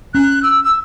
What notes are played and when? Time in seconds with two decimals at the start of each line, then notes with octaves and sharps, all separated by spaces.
0.14 C#4 F#6
0.43 E6
0.64 E6